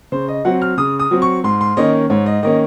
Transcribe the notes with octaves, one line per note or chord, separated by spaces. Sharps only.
C#3 C5
D#5
F#3 C4 F#5
F6
C#3 D#6
D#6
F#3 C4
C#6
G#2 C6
C6
D#3 A#3 C#4 D#5
G#2 C#5
D#5
D#3 A#3 C#4 D#5